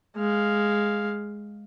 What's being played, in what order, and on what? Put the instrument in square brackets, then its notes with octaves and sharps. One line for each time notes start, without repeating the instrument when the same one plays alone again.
[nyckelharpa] G#3 F5